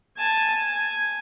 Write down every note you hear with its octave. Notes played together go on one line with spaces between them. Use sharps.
G#5 A5
G#5